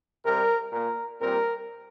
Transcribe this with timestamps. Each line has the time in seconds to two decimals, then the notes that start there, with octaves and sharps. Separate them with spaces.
0.24 C3 G3 C4 A#4
0.72 A#2 A#3 A#4
1.20 A#2 G3 C4 A#4